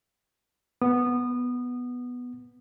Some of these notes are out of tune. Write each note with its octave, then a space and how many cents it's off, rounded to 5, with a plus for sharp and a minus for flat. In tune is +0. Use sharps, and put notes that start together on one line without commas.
B3 +0 D#6 -25